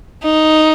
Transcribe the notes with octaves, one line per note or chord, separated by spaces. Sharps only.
D#4